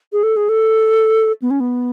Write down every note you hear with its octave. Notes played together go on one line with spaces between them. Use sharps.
G#4
A4
G#4
A4
B3
C#4
B3